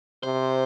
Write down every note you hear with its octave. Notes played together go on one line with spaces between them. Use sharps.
C3 C5